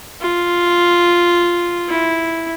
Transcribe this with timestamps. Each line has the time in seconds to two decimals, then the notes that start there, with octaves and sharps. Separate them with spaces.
0.21 F4
1.89 E4